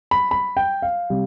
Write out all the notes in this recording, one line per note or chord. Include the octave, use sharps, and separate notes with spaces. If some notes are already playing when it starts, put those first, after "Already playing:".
B5
B5
G5
F5
C3 G3